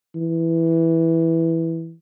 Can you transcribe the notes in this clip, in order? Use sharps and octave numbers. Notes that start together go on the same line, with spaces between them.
E3